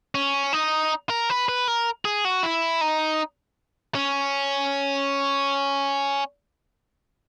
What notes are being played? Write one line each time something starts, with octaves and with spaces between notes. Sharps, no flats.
C#4
D#4
A#4
B4
B4
A#4
G#4
F#4
E4
D#4
C#4